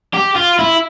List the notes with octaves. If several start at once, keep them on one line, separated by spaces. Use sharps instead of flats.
G4
F4
E4